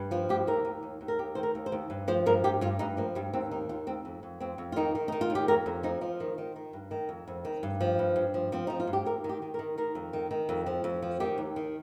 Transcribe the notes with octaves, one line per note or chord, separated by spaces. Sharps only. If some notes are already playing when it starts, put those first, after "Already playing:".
Already playing: G2
F3 F4
G2 G4
D#2 A#4
D#2
D#2
D#2
A#4
D#2 G4
D#3 C5
A#4
D#2
C5
D#2
G2
F3 C5
G2 A#4
G2 G4
G2 F4
G2 D#4
F3 A#3
G2 G3
D#2 C4
D#3 D#4
D#2 F4
D#2 C4
F2
F2
F2 C4
F2
F4
D#3 D#4
D#3
D#3 D#4
F4
D#2
G4
F2 A#4
F2
F3 D#4
F3 F4
D#3
D#3
D#3
G2
D#3
F2
F2
D#3
G2
F3
G2
G2
F3
F3 C4
F3 D#4
F4
G2
G4
D#2 A#4
D#3
G4
D#3
A#4
D#3
D#3 A#4
F2
D#3
D#3
F2
F3
F2
F3
D#3 G4
D#2
D#3